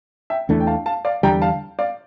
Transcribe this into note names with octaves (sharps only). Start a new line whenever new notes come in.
E5 G5
E2 E3 A3 D4
G5
F5 A5
F5 A5
D5 F5
E2 D3 G3 G5 A#5
F5 A5
D5 F5